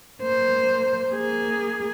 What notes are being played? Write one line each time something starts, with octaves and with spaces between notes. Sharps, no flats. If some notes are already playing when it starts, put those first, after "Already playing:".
A#3 C5
A#3 G#4